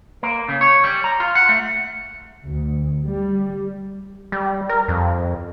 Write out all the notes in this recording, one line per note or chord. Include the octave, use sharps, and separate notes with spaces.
A#3
C#3
C#5
G3
A#5
F4
F#5
A3
D2
G3
G3
A#4
F2